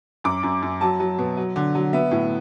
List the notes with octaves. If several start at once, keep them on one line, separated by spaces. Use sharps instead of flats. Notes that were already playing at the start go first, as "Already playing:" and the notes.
F#2 D6
F#2
F#2
F#3 A5
F#3
B2
F#3
D3
F#3
B3 E5
A2